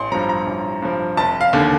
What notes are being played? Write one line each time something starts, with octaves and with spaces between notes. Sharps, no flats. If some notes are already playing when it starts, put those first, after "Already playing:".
Already playing: A1 C6
G2 F3 A#5
A#5
A1
G2 F3
F1 A5
F5
D#2 D3